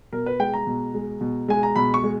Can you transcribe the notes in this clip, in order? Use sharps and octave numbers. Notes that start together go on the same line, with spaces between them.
B2 A#4
B4
G#3 G5
A#5
B2
G#3
B2
G#3 G#5
A#5
B2 B5
C#6
G#3